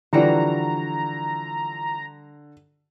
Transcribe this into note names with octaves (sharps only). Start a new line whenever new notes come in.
D3 E3 F3 G3 F#4 C5 A#5